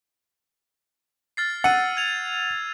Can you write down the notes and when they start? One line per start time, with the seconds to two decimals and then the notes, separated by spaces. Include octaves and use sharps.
1.37 F6 A6 C7
1.64 F#5 E6 D#7
1.97 G#6 F7